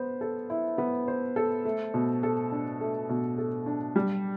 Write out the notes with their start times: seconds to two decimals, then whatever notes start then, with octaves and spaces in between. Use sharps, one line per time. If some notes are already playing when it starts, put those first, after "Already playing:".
Already playing: B3 C5
0.21 A4
0.50 E4
0.78 B3
1.08 C5
1.36 A4
1.65 A3
1.94 B2
2.23 A4
2.52 D4
2.81 A3
3.09 B2
3.38 A4
3.66 D4
3.96 G3